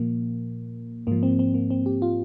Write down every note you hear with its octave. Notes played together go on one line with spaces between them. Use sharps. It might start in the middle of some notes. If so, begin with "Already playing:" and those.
Already playing: A#2 F3 A#3
G#2 F3 A#3
C4
C4
A#3
C4
G4
F4